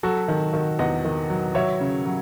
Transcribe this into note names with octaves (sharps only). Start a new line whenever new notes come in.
F#3 F#4 A4
D#3
D#3
E2 D#5 F#5
D#3
F#3
F#3 C#5 E5
C#3
F#3